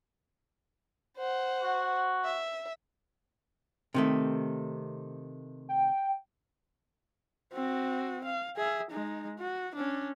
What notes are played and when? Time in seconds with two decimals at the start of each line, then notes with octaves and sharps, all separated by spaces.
1.17 C5 F#5
1.62 F#4
2.24 E5
3.94 C3 D#3 A3
5.69 G5
7.53 C4 F#4
8.24 F5
8.57 G#4 E5
8.91 G#3 D#4
9.39 F#4
9.76 C#4 D4